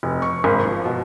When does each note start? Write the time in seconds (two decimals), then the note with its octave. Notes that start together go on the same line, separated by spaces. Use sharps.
0.03 F1
0.22 C#6
0.44 G#1
0.65 F3
0.85 B2